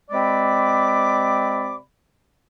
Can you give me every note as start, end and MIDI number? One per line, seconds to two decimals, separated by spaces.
0.11 1.77 48
0.11 1.77 56
0.11 1.77 60
0.11 1.77 74
0.11 1.77 83
0.11 1.77 86